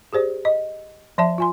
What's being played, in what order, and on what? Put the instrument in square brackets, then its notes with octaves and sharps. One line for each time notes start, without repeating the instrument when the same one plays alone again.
[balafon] G4 G#4 C5 D5
D#5
F3 D5 E5 A5
F4 G#5 C6